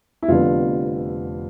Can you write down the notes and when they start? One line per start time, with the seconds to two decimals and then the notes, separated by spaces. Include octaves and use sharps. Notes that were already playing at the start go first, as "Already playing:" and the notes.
0.23 E4
0.28 F1 F2 D3 G3 B3 F4